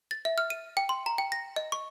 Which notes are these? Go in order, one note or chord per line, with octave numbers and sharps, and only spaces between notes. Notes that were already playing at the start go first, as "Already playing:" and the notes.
A6
E5
F6
D#7
G5
C6
A#5
G5
A#6
D#5
C#6